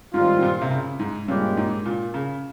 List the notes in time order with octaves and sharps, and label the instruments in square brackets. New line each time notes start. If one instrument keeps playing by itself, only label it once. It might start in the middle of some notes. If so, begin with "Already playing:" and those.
[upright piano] G#2 [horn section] D#3 G3 C4 F4
[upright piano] G#2
A#2
C3
C#3
G#2
[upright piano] G2 [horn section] A#2 G#3 C#4 G4
[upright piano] G#2
A#2
C#3